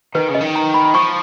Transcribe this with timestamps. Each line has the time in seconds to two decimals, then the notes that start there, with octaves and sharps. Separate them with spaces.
0.15 D#3 B4
0.28 C#3
0.35 D#5
0.41 D#3
0.55 A#5
0.74 B5
0.85 B5
0.94 F3 C#6